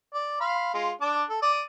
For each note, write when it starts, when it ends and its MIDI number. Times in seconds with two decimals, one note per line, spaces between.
0.13 0.38 74
0.40 0.70 77
0.40 0.70 83
0.40 0.70 84
0.74 0.91 56
0.74 0.91 65
1.01 1.23 62
1.01 1.23 81
1.01 1.23 86
1.29 1.42 69
1.42 1.62 74
1.42 1.62 87